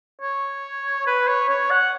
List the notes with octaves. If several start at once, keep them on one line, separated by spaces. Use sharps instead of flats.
C#5
B4
C#5
C#5
F#5